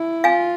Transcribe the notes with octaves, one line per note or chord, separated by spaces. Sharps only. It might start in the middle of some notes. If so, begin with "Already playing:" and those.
Already playing: E4
F4 F5 G#5